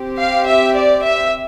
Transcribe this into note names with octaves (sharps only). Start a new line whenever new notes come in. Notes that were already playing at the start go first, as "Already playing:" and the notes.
Already playing: C4 G4
F5
E5
D5
E5